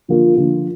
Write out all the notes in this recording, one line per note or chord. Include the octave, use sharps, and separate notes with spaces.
D3 F3 A#3 F4
D3 F3 A#3 F4